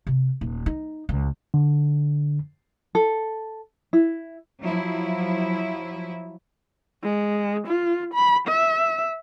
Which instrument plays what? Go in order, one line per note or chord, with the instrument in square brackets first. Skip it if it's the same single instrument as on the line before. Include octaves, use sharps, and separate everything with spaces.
[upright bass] C3
D#1
D#4
C#2
[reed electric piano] D3
[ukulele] A4
E4
[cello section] F3 F#3 E4
[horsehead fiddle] G#3
F4
B5
E5